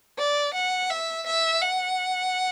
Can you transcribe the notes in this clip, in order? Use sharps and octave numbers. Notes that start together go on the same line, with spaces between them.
D5
F#5
E5
E5
F#5